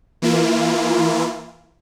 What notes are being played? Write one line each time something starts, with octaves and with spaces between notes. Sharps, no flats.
E3 A#3 E4 F4